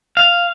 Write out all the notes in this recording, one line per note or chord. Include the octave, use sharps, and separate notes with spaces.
F5